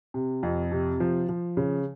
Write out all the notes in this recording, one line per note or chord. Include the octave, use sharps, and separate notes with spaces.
C3
F2
C3
F3
F3
C#3